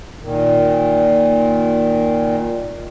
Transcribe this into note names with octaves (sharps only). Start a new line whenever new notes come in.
A#2 D#3